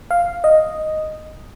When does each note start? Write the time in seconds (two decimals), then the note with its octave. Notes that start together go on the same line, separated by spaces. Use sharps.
0.11 F5
0.44 D#5